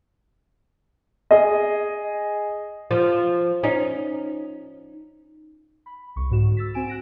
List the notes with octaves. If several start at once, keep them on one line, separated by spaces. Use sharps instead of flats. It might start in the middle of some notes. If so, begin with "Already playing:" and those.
G#4 D#5
F3
C#4 D#4
B5
C2 C#6
G#2 D3 F#4 E7
E6 A6 B6
C4 F#4 G#5 D7 E7
F#6 A#6 D7